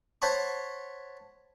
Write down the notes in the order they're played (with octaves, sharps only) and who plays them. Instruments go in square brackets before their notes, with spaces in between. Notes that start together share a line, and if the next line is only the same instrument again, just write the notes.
[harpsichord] C5 C#5 F#5 A5 B5 C#6